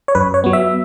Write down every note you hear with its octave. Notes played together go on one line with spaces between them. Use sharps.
C#5
F#2 B4
C#5
F#3 B3
E5